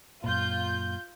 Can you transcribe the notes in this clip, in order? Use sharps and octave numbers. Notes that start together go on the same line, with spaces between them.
F#2 A#2 F4 G6